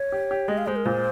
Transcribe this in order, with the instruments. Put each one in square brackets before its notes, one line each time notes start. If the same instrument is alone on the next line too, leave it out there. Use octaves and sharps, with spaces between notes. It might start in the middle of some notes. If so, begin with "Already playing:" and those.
Already playing: [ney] C#5
[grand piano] G4
G4
[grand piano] G#3 [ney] D#5
[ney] F5
[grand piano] G#3 [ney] C5
[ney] A#4
[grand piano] A#2 [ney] C5